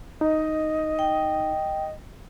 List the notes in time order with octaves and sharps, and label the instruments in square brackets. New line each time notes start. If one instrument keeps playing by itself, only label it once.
[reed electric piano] D#4 [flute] D#5
[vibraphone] G5